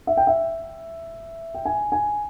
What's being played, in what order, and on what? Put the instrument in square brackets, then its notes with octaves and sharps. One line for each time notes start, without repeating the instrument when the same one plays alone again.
[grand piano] E5
G5
E5
G5
G#5
G#5